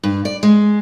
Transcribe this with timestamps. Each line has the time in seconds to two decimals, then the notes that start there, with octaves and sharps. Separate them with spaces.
0.03 G2
0.25 D5
0.43 G#3